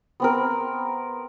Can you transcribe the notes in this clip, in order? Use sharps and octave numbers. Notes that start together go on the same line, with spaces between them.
B3 C4 A#4